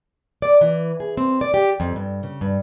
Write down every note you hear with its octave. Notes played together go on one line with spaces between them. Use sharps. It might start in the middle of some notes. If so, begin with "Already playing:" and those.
D5
E3
G#4
C4
D5
G4
F2
G2
C#3
G2